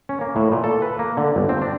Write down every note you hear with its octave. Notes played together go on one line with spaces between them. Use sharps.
C#4
A#3
A2
A#2
A4
B4
A#3
D3
G1
C4
D4